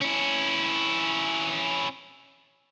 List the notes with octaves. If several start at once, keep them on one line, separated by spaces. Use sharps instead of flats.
C#4 E4